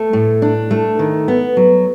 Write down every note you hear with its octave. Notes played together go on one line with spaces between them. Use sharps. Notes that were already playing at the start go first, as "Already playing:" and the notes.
Already playing: A3
A2
D4
A3
D#3
B3
F#3